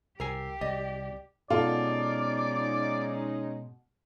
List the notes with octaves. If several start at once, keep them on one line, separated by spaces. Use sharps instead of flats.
C2 G4 A#4 G#5 E6 C7
C2 D5 D#5
B2 G#3 C#4 D#4 F4 A4 D5